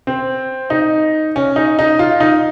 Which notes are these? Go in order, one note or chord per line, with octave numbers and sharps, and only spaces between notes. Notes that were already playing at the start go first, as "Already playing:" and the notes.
C4
D#4
C#4
D#4
D#4
F4
D#4